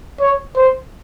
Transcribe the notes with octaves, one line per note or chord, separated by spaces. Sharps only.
C#5
C5